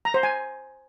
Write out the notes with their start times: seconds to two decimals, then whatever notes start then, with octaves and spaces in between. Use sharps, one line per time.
0.05 A#5
0.14 C5
0.23 G#5